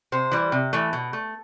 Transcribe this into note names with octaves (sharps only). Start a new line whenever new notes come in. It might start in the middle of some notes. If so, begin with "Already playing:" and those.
C3 C5
E3 G3
C3
E3 A3
B2
A3